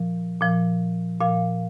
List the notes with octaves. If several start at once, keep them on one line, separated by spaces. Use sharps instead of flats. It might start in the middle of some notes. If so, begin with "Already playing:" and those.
Already playing: A#2 F3
A#2 F3
A#2 F3 F5